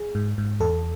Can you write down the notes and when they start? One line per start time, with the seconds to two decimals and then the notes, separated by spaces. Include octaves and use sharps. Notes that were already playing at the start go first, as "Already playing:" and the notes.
Already playing: G#4
0.15 G#2
0.38 G#2
0.60 E2 A4